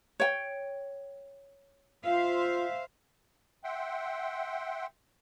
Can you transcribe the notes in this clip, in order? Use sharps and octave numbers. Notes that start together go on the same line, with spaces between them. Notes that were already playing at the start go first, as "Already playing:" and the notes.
C#5 G5
F4 C5 E5 F5
E5 F#5 G5 C6